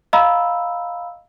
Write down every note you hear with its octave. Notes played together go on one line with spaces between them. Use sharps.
D#5 F5 A#5 B5 E6